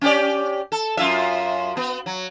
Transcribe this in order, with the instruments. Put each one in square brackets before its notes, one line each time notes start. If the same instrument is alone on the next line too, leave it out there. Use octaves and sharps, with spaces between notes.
[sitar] C#4 G4 D5
A4
F#2 F4 E5
B3
F#3